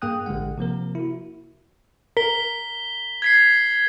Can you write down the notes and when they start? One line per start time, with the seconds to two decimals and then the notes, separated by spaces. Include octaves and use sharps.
0.02 G2 A#3 G#4 G5 D#6 F#6
0.26 A1 D3 G#3 F#5
0.58 C3 F3 A#3 A#4
0.95 E4 F#4
2.17 A#4 B6 G7
3.22 G#6 B6 C7